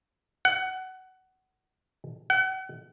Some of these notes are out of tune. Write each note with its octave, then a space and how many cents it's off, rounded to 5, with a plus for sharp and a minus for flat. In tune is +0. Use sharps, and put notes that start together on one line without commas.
F#5 +20
F#5 +40